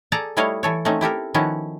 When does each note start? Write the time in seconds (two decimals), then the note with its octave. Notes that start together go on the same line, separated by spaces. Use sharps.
0.12 G#4 A4 D5 A5 A#5
0.37 G3 A3 E4 C#5 D#5 F5
0.63 E3 A4 C#5
0.85 A3 C4 C#4 D#4
1.01 E4 G4 A4 A#4
1.34 D#3 F3 B3 C#4 E4 F#4